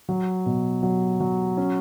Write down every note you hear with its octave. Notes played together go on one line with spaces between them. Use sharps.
F#3
B2
F#3
F#3
C#4